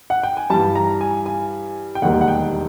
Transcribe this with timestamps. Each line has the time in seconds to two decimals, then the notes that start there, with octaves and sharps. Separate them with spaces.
0.10 F#5
0.23 G5
0.37 G#5
0.50 G2 E3 G3 A5
0.75 A#5
1.01 G#5
1.26 G#5
1.95 G5
2.02 E1 D#2 D#3 G3 F#5
2.21 F#5
2.28 G5